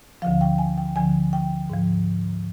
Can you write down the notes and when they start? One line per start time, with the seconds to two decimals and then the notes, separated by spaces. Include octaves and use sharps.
0.22 D2 D3 F3 F5
0.41 G5
0.58 G#5
0.78 G5
0.96 D2 D3 F3 G#5
1.33 G5
1.70 G#2 F3